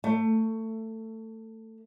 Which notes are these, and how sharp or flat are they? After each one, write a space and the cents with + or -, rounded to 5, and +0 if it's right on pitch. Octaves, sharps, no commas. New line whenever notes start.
A3 +20